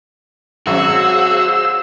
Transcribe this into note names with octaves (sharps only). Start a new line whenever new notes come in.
G#1 F#3 C#4 F#4 G#4 C5 F5 E6